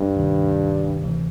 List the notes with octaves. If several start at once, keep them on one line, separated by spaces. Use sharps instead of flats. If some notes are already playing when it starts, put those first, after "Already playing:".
Already playing: G2
D2 C3 D#3
D2 C3 E3